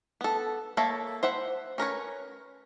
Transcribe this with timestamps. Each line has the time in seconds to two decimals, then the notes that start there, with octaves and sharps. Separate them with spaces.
0.21 B3 A4
0.77 A#3 A4 C#5 E5 A5
1.23 C5 E5 F#5 B5
1.78 C#4 A#4 B4 C#5